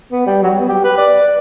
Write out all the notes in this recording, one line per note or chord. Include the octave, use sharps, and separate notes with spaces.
B3
G3
F#3
G3
B3
G4
B4
D5